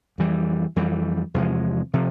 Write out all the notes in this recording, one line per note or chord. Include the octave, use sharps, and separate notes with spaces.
F2 E3 G3
F2 E3 G3
E2 C3 F3 G#3
C3 F3